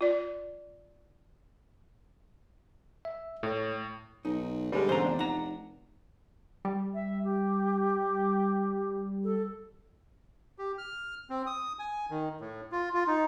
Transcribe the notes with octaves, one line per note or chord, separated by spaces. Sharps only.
F4 D5
E5
A2 A3 C#5
B1 D#4
D3 G3 G#3
G#2 C#3 E3 B3 C5 A#5
F1 D4
D#4 F#5 A#5
G3
E5
G4
A4
G4
F6
C4
D#6
G#5
D#3
A2
F4
F4
D#4